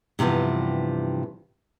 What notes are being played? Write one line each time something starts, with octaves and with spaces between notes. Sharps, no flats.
G2 C3 E3 F3 B3